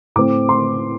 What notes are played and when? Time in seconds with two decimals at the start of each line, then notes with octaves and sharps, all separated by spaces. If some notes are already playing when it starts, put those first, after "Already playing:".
0.16 A2 A3 C4 D6
0.49 C6